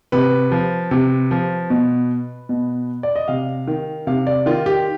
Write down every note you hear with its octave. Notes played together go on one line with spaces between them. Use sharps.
C3 B4
F3
C3
F3
B2
B2
D5
D#5
C3 F5
D#3
C3 F5
D5
D#3 F4
G4